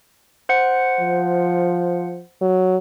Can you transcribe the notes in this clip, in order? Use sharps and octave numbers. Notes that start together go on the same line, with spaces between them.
C5 F#5 C#7
F3
F#3